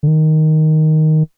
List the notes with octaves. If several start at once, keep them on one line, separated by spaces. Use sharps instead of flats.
D3
D#3